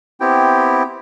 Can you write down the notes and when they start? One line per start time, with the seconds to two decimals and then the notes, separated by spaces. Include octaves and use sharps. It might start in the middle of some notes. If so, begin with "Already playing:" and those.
0.20 B3 C4 E4 G4 G5